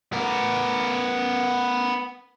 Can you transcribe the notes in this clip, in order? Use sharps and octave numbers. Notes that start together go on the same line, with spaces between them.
B3 A#4